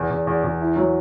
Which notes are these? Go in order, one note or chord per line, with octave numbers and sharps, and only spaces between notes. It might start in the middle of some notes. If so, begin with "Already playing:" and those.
Already playing: E2
E2
E2
E2
E4
F#3